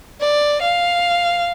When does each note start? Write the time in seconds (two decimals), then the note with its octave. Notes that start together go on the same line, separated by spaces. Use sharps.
0.21 D5
0.61 F5